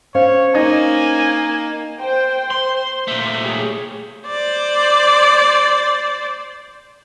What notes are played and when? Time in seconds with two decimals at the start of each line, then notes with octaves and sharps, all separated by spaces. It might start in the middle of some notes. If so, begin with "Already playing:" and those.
0.15 C#4 C5 C#5 F5
0.55 A#3 D#4 G#5
1.99 C5 G5
2.50 C5 C6
3.08 A#2 A3
3.42 G4 G#4 C#5
4.27 C5 D5